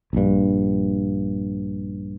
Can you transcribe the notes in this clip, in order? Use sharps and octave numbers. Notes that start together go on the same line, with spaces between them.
A#1 G2